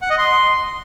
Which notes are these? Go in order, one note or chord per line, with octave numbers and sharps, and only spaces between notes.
F#5
D#5
C6